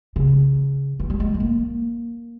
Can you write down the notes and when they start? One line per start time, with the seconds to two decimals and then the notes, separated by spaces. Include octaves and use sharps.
0.16 C#3
1.00 E3
1.10 G3
1.20 G#3
1.34 G#3
1.40 A#3